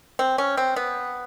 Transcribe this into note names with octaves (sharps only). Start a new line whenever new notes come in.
C4
C#4
C4
B3